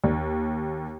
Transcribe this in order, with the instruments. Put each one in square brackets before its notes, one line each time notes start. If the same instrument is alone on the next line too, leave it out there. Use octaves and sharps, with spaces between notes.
[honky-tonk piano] D#2